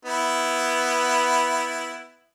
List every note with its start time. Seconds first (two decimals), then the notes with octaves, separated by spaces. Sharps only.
0.05 B3 E4